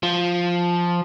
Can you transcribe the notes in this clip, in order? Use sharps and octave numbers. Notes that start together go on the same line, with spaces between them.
F3